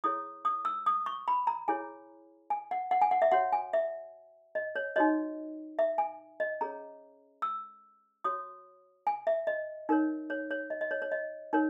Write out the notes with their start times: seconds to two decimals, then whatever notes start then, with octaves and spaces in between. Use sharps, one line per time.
0.04 E4 G#4 C#5 D#6
0.45 D#6
0.65 E6
0.86 D#6
1.06 C#6
1.28 B5
1.47 A#5
1.68 E4 G#4 C#5 G#5
2.50 G#5
2.71 F#5
2.91 F#5
3.01 G#5
3.11 F#5
3.22 E5
3.32 F#4 C#5 F#5
3.52 G#5
3.73 E5
4.55 D#5
4.76 C#5
4.96 D#4 F#4 C#5 D#5
5.79 E5
5.98 G#5
6.40 D#5
6.61 C#4 G#4 C#5 A#5
7.42 E6
8.24 F#4 C#5 D#6
9.07 G#5
9.27 E5
9.47 D#5
9.89 D#4 A#4 C#5
10.30 C#5
10.51 C#5
10.70 D#5
10.81 D#5
10.91 C#5
11.02 C#5
11.12 D#5
11.53 D#4 A#4 C#5